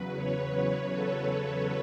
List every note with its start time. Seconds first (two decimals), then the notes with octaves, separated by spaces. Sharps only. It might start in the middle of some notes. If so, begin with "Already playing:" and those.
Already playing: E2 C#3 F#3 B4
0.14 C#5
0.52 B4
0.91 A4